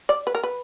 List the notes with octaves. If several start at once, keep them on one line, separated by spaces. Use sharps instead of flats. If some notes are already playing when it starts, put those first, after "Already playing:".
D5
B4
A#4
B4